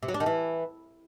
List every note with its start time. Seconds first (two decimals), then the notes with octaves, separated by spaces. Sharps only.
0.03 C3
0.08 F#3
0.14 D4
0.20 D#3
0.26 E3